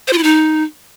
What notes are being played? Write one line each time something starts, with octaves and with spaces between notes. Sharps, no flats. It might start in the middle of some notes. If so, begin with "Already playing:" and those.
C5
F4
E4
D#4